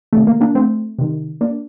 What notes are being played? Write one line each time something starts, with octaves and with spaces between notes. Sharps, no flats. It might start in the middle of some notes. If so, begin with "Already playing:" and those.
C3 D#3 A3
A#3
A#3 D4
A3 C4
C3 D#3
A#3 D4